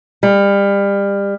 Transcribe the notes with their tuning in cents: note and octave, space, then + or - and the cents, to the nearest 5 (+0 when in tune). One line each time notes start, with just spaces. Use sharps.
G3 +30